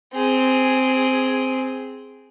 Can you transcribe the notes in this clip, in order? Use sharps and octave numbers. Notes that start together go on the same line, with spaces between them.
C4 G#4